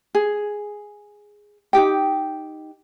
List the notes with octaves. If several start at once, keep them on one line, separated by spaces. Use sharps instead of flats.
G#4
D#4 F4 G4 G5